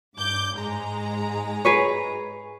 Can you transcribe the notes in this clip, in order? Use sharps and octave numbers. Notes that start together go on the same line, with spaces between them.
G2 D6 G6
G#2 G#3 A#5
G#4 B4 C#5